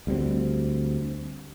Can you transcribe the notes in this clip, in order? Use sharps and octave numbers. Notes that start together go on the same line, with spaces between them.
D2 G3 G#3 C4